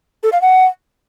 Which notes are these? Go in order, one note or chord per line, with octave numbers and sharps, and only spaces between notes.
A4
F5
F#5